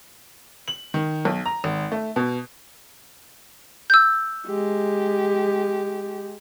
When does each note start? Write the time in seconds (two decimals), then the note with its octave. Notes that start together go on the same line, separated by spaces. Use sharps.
0.68 F#7
0.94 D#3
1.25 B1
1.46 A#5
1.64 G#1
1.92 A3
2.16 B2
3.90 E6 G6
4.46 G#3 G4